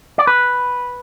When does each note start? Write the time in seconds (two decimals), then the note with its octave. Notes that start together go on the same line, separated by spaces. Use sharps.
0.18 D5
0.27 B4